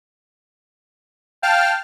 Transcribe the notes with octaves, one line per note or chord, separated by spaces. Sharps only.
F5 G5 A5 F6